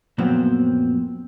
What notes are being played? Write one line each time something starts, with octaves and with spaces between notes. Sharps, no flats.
F#2 A#2 F3 F#3 B3 C4